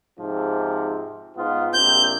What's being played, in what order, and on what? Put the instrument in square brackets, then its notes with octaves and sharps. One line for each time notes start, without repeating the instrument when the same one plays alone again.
[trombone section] G#2 C3 F3
G#2 B3 F4
[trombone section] A#1 C3 C4 [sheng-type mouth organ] G6